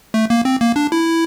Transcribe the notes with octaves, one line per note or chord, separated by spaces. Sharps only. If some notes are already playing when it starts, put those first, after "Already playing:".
A3
A#3
C4
A#3
D4
E4